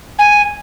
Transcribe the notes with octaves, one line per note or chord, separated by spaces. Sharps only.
G#5